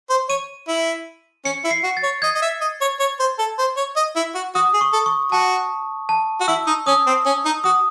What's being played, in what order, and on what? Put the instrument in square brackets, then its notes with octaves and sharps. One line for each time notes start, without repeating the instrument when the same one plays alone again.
[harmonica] C5
[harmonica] C#5 [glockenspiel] D#7
[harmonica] E4
[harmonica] C#4 [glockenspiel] C#7
[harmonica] E4
[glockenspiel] C7
[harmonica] F#4
[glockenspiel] A6
[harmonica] C#5
[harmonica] D#5 [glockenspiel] G#6
[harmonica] D#5
E5
D#5
C#5
C#5
C5
A4
C5
C#5
D#5
E4
F#4
[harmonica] F#4 [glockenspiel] D#6
[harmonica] G#4
[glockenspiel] C#6
[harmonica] A4
[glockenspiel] C#6
[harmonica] F#4 [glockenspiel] A5
[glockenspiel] A5
[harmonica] F#4
[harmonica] E4 [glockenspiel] E6
[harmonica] D#4
[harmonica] C#4 [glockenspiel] D#6
[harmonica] C4
C#4
D#4
[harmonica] F#4 [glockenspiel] D#6